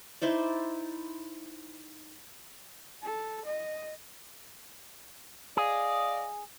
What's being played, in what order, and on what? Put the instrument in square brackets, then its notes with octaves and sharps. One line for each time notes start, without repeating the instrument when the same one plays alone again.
[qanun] D#4 E4 C5 D5
[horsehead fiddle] A4
D#5
[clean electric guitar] G#4 [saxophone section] D5 D#5 F5